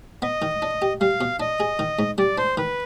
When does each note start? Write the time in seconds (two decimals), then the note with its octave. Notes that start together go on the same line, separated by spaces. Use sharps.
0.22 B3 D#5
0.42 D#3
0.62 D4
0.82 G4
1.01 G3 F5
1.21 B2
1.40 D4 D#5
1.60 G#4
1.79 D#3
1.99 G#2
2.18 G3 D5
2.38 D4 C5
2.57 D#3 B4